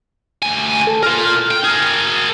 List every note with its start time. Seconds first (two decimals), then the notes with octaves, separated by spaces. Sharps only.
0.43 D2 G#5
0.87 A4
1.03 F4 A#4 F6
1.51 G5
1.64 G#4 A#4